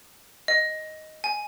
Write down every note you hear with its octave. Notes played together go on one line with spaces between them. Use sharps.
D#5
G#5